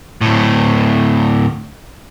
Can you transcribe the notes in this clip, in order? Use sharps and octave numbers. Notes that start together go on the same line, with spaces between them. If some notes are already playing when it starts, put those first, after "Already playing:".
D2 A2